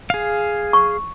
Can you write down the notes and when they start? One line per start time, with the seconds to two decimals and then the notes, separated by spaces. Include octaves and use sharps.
0.10 G#4 F5
0.73 C#6